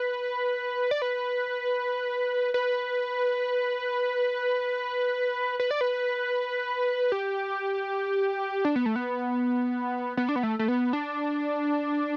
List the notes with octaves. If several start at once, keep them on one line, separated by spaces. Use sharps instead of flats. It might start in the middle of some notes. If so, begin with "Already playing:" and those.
Already playing: B4
D5
B4
B4
B4
D5
B4
G4
D4
B3
A3
B3
B3
D4
B3
A3
A3
B3
D4